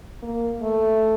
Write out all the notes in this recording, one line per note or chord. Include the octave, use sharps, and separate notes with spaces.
A#3
A3